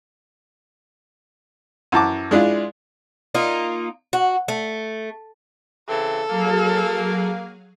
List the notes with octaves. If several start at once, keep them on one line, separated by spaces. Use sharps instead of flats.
F#2 E3 A5 D6
G#3 D4 E4 F4
A#3 D#4 F4
F#4
A3
C#3 E3 C4 A4
F#3 A#3 G#4 F5